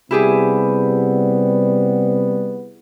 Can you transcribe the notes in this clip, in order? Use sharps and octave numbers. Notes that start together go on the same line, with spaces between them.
C3 G3 B3 E4 G4 G#4